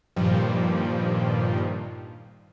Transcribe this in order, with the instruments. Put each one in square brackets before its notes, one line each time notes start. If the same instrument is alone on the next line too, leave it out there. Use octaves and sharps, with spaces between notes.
[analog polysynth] G2 A#2 D#3 F3 G3